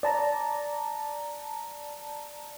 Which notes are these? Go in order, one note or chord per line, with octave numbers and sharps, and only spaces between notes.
D5 A5 A#5